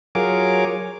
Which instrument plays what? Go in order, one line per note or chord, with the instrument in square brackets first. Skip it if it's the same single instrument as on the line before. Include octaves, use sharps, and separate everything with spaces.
[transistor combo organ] F#3 F4 G#4 A#4 C#5 D6